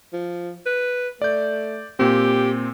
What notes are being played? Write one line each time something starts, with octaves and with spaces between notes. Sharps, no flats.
F3
B4
A3 D5 G6
A#2 C4 G4